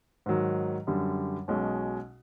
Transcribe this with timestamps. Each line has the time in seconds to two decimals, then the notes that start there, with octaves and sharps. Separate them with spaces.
0.26 G#2 D#3 F#3
0.87 F#2 D3 G3
1.48 B1 B2 G#3 C#4